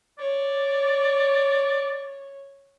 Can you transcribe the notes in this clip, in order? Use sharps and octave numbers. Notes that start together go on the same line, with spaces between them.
C#5 D5